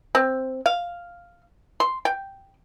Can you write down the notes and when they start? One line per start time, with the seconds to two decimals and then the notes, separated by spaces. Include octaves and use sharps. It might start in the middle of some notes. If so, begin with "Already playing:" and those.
0.15 C4
0.66 F5
1.80 C6
2.05 G5